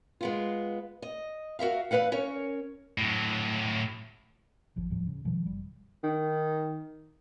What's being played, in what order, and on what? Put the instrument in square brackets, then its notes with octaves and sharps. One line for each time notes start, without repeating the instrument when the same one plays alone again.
[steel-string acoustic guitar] G#3 B3 F4
D#5
F#4 A#4 E5 F5
E2 G#3 B4 F5 F#5
C#4 A#4 C#5
[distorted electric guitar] A2 F#3
[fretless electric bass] D1 G1 F3
D#1 A2 F3 G3
C#3
B2 D#3 F3 G3
F#1 G3
[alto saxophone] D#3